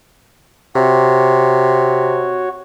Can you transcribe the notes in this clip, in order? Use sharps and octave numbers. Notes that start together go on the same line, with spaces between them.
C3 F#4 C#5